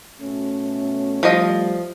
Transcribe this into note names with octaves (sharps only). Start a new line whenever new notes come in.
B2 A3 C#4
F3 G3 A3 D#5